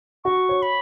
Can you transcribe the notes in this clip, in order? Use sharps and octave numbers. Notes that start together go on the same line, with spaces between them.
F#4 C#6
C#5
B5